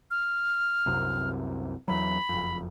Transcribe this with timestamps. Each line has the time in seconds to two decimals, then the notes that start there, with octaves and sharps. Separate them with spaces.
0.11 F6
0.86 C2 F#2 C3
1.88 E2 E3 F#3 B5
2.29 F#1 F2